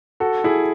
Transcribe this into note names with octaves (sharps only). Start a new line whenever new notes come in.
F#4 A4
E4 G#4